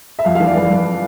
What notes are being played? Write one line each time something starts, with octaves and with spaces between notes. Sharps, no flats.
E5
F2 F5
F5
E3
D5
F2 B4
F2